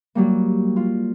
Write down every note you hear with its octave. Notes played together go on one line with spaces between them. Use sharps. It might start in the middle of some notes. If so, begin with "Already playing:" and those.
F#3 G3 A#3
F4